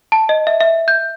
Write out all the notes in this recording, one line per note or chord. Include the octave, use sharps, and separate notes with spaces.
A5
D#5
E5
E5
G6